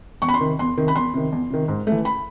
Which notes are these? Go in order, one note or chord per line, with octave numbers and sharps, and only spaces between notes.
E2 C#6
B5
C6
C3 D#3
E2 C6
C3 D#3
B5
E2 C6
C3 D#3
E2
C3 D#3
G#2
A3
E3
B5